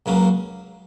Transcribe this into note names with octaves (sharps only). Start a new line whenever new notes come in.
C#2 C#3 F#3 A#3